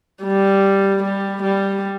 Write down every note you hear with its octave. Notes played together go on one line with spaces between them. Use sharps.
G3
G3
G3